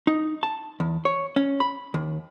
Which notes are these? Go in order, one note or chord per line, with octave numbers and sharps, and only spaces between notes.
D#4
A5
E2
C#5
C#4
B5
D#2